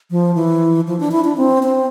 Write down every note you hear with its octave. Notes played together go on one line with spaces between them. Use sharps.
F3
E3
F3
D4
E4
D4
C4
C4